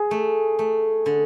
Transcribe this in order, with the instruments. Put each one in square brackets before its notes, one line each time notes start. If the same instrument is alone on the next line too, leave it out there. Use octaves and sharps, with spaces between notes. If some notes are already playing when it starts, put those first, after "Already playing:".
Already playing: [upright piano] G#4 G#5
[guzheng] A3
A3
D3